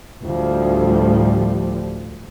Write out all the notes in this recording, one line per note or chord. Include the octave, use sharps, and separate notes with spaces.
D2 A2 F3 G3